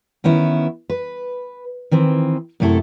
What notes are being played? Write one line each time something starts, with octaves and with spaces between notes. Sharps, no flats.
D#3 B3 C#4 E4
B4
D#3 E3 C4
F#2 C3 A3 E4 A4